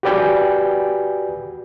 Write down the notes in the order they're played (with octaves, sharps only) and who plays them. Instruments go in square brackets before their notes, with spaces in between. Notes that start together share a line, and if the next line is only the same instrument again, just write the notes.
[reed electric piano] F#4 G4 B4 D5 G5 G#5